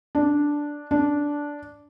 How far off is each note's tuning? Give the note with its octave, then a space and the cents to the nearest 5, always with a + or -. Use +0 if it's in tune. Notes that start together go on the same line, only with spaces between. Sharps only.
D4 -5
D4 -10